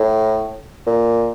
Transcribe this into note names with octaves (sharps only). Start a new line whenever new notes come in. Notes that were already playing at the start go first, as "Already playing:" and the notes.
Already playing: A2
A#2